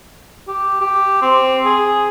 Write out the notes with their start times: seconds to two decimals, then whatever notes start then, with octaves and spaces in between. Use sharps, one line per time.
0.48 G4
0.81 G4
1.22 C4
1.65 G#4